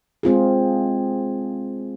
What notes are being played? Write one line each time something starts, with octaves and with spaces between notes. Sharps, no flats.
G#3 C4 F4 G#4